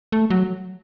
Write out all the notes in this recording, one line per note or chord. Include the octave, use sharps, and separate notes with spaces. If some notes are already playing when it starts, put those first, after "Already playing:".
A3
F#3